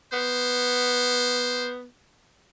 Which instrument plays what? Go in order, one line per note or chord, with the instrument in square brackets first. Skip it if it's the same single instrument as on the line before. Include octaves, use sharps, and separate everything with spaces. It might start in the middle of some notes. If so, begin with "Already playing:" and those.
[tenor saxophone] B3 [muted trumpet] C5